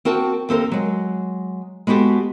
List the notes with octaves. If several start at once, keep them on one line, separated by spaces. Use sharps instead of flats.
C4 F#4 A#4 G5 A5
D#2 C4 A4 A#4
F#3 G#3
G#3 B3 F#4 G4 A4